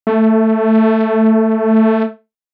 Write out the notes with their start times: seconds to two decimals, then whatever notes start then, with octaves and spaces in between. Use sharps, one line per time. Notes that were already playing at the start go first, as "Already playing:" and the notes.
0.07 A3